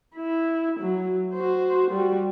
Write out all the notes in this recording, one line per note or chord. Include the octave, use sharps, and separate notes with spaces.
E4
F#3
F#4 C5
G3 F#4